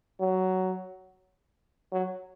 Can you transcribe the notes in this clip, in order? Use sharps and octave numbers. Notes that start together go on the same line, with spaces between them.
F#3
F#3